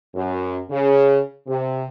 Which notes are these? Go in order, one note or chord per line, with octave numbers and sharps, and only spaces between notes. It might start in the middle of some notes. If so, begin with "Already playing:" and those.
F#2
C#3
C3